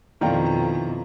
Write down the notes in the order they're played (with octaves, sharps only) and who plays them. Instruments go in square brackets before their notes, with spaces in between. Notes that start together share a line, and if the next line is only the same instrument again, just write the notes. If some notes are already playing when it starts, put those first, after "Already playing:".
[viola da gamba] F2 B2 [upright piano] D#3 F4 [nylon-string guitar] E4 D5 G5 [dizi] A#5